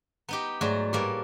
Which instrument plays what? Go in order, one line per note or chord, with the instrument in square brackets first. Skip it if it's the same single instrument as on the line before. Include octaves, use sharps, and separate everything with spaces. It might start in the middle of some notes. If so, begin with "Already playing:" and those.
[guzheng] B3 D#4 G4 [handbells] A#5
[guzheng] G#2 F#3 F#4 [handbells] A3 D5
[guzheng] A2 G3 A#3 [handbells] G4 B4